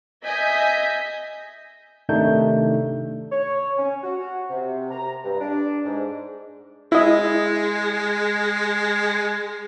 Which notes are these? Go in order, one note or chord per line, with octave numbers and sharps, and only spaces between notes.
D#5 E5 G#5 G6 B6
C3 D#3 A3 D4 D#4 G6
C#5
C#4
F#4
C3
A#5
G2
D4
G#2
G#3 E4 D#5